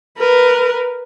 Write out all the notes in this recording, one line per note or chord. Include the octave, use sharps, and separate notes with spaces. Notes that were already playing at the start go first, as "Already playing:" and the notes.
A#4 B4